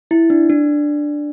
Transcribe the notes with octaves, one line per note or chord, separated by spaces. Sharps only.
E4
D4
D4